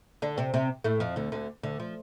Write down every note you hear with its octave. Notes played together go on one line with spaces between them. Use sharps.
D3 D4
C3 C4
C3 C4
A2 A3
F2 F3
D2 D3
D2 D3
D2 D3
F3